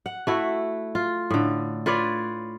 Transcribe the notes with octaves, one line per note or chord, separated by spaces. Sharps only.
F#5
A3 E4 F#4
F4
A2 D3
F4 B4 C#5 D5